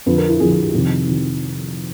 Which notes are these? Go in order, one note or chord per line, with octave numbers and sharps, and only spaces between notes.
F2 D3 F3 B4
A#4
E4
F2 D3 F3 G#4
G#4
G4
F2 C3 D#3
C3 D#3